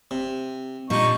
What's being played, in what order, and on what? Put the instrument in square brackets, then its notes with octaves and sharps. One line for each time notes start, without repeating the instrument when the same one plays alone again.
[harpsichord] C3
[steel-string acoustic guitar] A#2 G3 D4 [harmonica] D#4 C#6